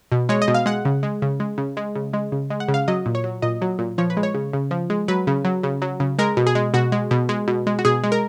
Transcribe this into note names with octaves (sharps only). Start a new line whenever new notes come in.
B2
G#3 C#5
D#5
B2
F5
G#3 F#5
C#3
G#3
C#3
G#3
C#3
G#3
C#3
G#3
C#3
G#3
F#5
C#3
F5
F#3 D#5
A#2
C#5
F#3
A#2 D#5
F#3
A#2
F3 C#5
B4
G#3
C#5
C#3
C#3
F3
G#3
F#3 B4
C#3
F#3
C#3
F#3
C#3
G#3 A#4
B2
G#4
G#3
B2 F#4
G#3
B2
G#3
B2
G#3
F#4
B2 G#4
G#3
A#4